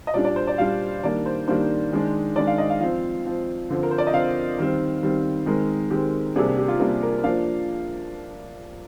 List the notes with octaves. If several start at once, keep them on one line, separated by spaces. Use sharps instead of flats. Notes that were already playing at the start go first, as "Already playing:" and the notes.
D#5
A#2 G3 D4 D5
D5
C5
D5
A#2 G3 D4 F5
D#3 G3 A#3 D4 D5
C5
D#3 G3 A#3 D4 C5
D#3 G#3 D4
D#3 G#3 D4 D5
F5
D#5
F5
F3 C4 F5
F3 C4
D3 F3 C4
A#4
C5
D5
D#5
D3 F3 C4 F5
D#3 G3 C4
D#3 G3 C4
D#3 G#3 C4 A#4
D#3 G#3 C4 G4
C3 G3 A#3 D4 G#4
G4
G4
F4
C3 G3 A#3 D4 A#4
A#4
F3 A#3 D4 F5